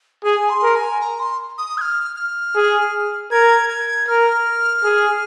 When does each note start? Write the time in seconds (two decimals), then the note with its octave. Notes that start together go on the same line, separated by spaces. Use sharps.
0.24 G#4 G#5
0.49 C6
0.63 A#4
0.75 G#5
1.01 A#5
1.20 C6
1.58 D#6
1.77 G#6
1.81 F6
2.16 F6
2.55 G#4
3.31 A#4 G#6
3.70 G#6
4.07 A#4 F6
4.84 G#4